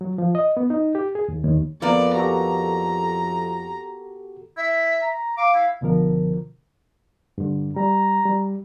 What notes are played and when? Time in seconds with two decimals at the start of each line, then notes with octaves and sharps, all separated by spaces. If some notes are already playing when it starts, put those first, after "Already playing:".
0.01 F#3
0.18 F3
0.35 D#5
0.57 B3
0.70 D#4
0.95 G4
1.15 G#4
1.28 D#2
1.44 D#2
1.82 F2 A#3 B3 A#4 D5
2.15 F#4 G4 A4 A#5
4.57 E4 E5
5.02 A#5
5.37 F5 D6
5.55 E4
5.81 C#2 B2 D3 F3 A#4
7.38 G2 D3
7.76 G3 A#5
8.25 G3